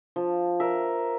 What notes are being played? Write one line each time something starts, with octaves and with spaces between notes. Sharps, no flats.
F3
A#4 E5